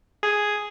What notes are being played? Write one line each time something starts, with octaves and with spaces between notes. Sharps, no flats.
G#4